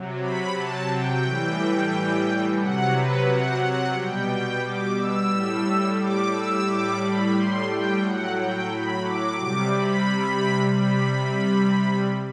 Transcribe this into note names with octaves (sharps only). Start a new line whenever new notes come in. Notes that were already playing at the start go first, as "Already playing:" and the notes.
Already playing: C3 F#3
B5
A5
G5
A2 E3 G3
C3 F#3 F#5
B4
F#5
F#5
B2 G3 G5
G5
D6
E6
A2 G3
D6
E6
A2 G3 D6
B5
C6
G5
A2 F#3 F#5
G5
B5
D6
C3 G3 D6
B5
C3 G3 B5